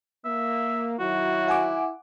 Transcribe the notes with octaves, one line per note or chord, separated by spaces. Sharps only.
A#3 E5
D#3 F#3 E4 F#4
F#5 G#5 D6